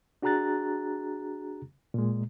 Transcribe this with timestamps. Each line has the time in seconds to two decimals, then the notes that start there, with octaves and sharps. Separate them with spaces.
0.22 D4 F#4 G#4 A#5 F#6 A6
1.94 A#2 G#3